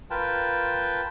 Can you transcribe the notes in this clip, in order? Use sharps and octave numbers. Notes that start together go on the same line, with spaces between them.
F4 A#4 B4 G5 A5